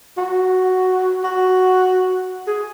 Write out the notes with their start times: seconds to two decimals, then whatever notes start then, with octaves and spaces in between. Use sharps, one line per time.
0.17 F#4
1.24 F#4
2.47 G#4